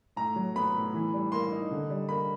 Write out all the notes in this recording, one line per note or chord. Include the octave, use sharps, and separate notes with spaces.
A2 A#5
F#3
B3 B5
A2
E3
G3
A#3 C6
D#4
D3
G3
A#3 B5